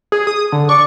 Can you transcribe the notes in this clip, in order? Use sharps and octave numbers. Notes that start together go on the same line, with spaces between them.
G#4
D#6
D3
D5 C#6